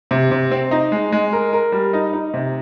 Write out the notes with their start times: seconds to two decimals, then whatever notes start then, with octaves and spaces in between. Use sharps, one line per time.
0.11 C3
0.31 C3
0.51 C4
0.71 D#4
0.92 G#3
1.12 G#3
1.32 A#4
1.53 A#4
1.72 G3
1.93 D#4
2.13 D#4
2.34 C3